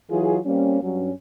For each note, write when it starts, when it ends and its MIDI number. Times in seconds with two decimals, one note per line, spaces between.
0.10 0.38 52
0.10 0.38 54
0.10 0.38 65
0.10 0.38 68
0.45 0.80 55
0.45 0.80 58
0.45 0.80 60
0.45 0.80 61
0.82 1.11 43
0.82 1.11 54
0.82 1.11 61